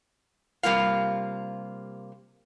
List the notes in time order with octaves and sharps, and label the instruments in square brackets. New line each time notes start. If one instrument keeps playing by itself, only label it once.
[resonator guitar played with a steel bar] C3 G3 A#3 F4 F5